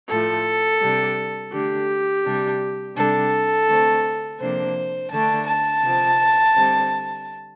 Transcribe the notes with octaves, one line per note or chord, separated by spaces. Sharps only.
A2 F3 A3 A4
C3 G3 D4
D3 A3 D4 G4
C3 G3 D4
C3 G3 D4 A4
D3 A3 C4
C3 F3 A#3 D4 C5
D3 A3 D4 A5
A5
C3 F3 C4
D3 G3 C4